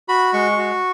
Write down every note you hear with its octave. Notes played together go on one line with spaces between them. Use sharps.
F#4 B5
G#3 C#6
F#4